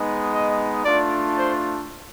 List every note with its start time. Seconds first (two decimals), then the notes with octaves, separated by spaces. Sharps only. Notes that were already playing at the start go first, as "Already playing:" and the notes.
Already playing: G#3 B3 D#4
0.32 D#5
0.83 A3 D4 F4 D5
1.36 C5